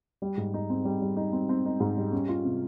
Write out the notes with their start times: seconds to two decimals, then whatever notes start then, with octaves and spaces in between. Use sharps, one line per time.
0.22 G3
0.37 G#2
0.54 D#4
0.70 C4
0.85 G3
1.02 G3
1.17 D#4
1.33 C4
1.49 C4
1.65 D#4
1.80 G#2
1.97 G3
2.12 C#4
2.28 F4
2.45 C3